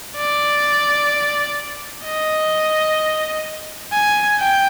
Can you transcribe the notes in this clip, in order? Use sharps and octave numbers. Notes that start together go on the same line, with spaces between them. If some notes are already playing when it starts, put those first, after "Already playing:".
D5
D#5
G#5
G5